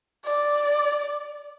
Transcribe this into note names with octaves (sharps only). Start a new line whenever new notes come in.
D5